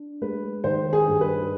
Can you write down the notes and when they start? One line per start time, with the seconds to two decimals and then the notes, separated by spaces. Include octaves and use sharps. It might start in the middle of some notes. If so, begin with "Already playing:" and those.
Already playing: D4
0.22 G#3 B4
0.64 D#3 C5
0.93 G#4
1.07 G2
1.21 B4